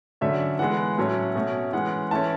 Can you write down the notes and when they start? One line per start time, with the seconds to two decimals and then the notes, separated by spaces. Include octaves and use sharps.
0.21 D3 F#3 A3 C#4 E5
0.59 E3 G#3 B3 F#5
0.98 A2 F#3 A3 C#4
1.36 B2 A3 C#4
1.72 E3 G#3 C#4 F#5
2.11 E3 A3 C#4 A5